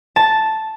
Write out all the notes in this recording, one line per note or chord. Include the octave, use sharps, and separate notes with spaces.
A5